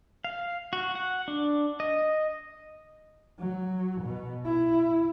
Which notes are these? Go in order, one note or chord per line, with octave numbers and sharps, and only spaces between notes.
F5
F#4
F#5
D4
D#5
F#3
B2
E4